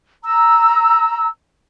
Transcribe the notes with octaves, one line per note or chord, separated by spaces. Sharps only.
A#5 E6